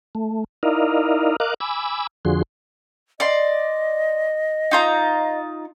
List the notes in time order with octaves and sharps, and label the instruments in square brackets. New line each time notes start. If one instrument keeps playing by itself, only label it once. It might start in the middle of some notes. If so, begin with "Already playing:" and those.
[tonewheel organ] A3
D#4 E4 A#4 D5 D#5 F5
A#4 D#5 F5 D6 F#6
G#5 B5 D6 E6
F2 D3 F3 F#4 G#4 C6
[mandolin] D5 C6 [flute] D#5
[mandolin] D#4 F4 A#5